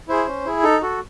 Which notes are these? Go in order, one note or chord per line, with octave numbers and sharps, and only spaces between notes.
E4 G#4 C5
C#4
E4 G#4
D#4 A4
F#4 A4